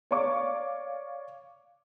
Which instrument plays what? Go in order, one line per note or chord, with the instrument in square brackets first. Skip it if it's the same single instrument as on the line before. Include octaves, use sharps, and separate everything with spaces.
[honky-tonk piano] C#5 D5 F5 C#6 D6